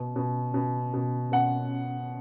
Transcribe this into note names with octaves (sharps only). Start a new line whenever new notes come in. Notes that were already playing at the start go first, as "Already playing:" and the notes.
Already playing: B2
B2
B2
B2
B2 F#5